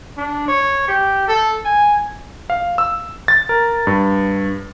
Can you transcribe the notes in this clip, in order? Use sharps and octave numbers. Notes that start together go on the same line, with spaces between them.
D4
C#5
G4
A4
G#5
F5
E6
A6
A#4
G2